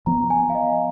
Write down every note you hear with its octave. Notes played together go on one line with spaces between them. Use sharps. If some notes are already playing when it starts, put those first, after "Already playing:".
F3 B3 A#5
G#5
F5
D#5